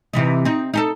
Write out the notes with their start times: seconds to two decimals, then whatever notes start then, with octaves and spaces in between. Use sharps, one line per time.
0.13 C3 E3 D#4
0.45 C4 D#4
0.74 D#4 G4 A4